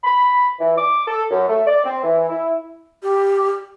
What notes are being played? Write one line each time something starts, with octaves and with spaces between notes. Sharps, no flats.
B5
E3
D6
A4
F#2
A3
D5
C4
E3
E4
G4